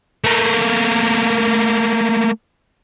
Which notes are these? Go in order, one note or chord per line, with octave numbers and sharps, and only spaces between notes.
A3 A#3